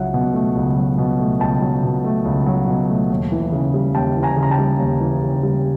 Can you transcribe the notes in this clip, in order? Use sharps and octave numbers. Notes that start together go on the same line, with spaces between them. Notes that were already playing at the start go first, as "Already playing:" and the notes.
Already playing: C#2 F#3 E5 F#5
B2
A3
C#2
F#3
B2
A3
C#2 G5 A5
F#3
B2
A3
C#2
F#3
B2
A3
D#2
E3
C#3
G3
D#2 G5 A5
E3
G#5 A#5
C#3
A#5
G5 A5
G3
D#2
E3
C#3
G3